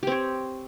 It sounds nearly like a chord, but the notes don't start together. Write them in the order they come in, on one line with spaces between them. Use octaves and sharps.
G4 C4 C#5